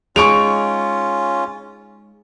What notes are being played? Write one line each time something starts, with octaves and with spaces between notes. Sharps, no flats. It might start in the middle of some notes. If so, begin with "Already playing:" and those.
G#3 C#4 D#4 F4 C#6 D7 F7